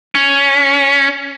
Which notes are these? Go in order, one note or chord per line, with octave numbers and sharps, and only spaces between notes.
C#4